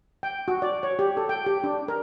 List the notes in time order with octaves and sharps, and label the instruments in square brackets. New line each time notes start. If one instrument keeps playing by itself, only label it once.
[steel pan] G5
F#4
D5
C#5
G4
A4
G5
G4
D4
A#4